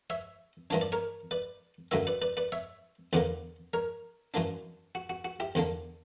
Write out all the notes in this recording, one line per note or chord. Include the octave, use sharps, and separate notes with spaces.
C#5 E5
G2 E3 A#3 D4 C#5
D5
A#4 C#5
B4 D5
F#2 D3 F#3 A#3 C#5 E5
B4 D5
B4 D5
B4 D5
C#5 E5
E2 D3 A#3 B4 D5
A#4 C#5
F#2 E3 A#3 D4
F#4
F#4
F#4
E4 G4
E2 D3 A#3 D4